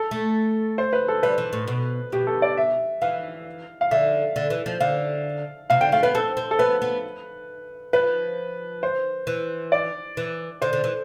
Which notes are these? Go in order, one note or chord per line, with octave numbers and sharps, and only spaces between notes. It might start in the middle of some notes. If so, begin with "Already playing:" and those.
Already playing: A4
A3
C5
B4
A4
G3 B4
E3
A2
B2
B2 G4
A4
D5
E5
E3 F5
F5
D3 E5
D3
E3
F3
D3 F5
C3 F5
D3 G5
A3 F5
B3 B4
C4 A4
C4
A4
B3 B4
B3
F3 B4
C5
E3
D5
E3
D3 C5
D3
E3